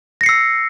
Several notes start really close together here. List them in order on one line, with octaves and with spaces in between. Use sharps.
A#6 C#7 C7 E6